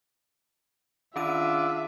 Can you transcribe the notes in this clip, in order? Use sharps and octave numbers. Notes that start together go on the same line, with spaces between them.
D#3 C#4 D4 F4 E5 D#7